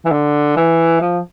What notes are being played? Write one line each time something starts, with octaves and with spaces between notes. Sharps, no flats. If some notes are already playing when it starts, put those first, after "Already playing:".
E3
D3
E3
F3